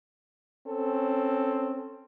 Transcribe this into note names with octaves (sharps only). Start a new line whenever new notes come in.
C4 C#4 A4